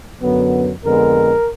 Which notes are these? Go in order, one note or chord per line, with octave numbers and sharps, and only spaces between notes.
F#2 D3 F#3 B3
F2 D3 G#3 B3 A#4